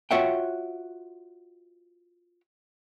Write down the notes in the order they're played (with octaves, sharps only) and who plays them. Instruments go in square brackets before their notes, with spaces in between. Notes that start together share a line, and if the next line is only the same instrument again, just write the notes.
[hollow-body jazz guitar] F4 F#4 C#5 E5 F#5 G5